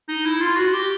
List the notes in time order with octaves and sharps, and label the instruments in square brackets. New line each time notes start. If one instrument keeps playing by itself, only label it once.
[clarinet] D#4
E4
F4
F#4
G4